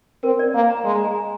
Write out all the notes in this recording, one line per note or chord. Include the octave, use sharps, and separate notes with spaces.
C4 A#4
D5
A#3 F5
A#5
G#3 C6
A#5
G#5
A#5